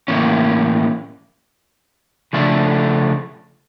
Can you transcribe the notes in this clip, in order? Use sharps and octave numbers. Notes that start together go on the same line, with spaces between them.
A2 E3 A#3 C#4
C#3 F3 A3 D4 A4